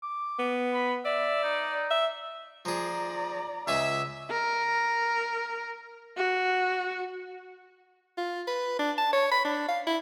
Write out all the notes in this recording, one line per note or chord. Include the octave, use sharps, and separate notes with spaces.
D6
B3
B5
D5 E5
D#4
E5
F3 G#4 D5 A#5
C#2 G#4 E5
A#4
F#4
F4
B4
D4
A5
C#5
B5
D4
F5
E4